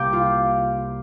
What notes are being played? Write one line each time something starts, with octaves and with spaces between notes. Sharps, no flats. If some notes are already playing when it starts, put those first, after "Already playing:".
Already playing: C2 C3 A#3 G4
F4